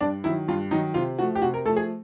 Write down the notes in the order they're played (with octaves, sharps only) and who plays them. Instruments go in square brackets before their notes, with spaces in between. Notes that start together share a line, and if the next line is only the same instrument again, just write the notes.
[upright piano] G2 D4
D#3 F#3 E4
G2 F4
D#3 F#3 D#4
C3 F4
F3 A3 F#4
G4
C3 F#4
A#4
A3 A4
F3
G#4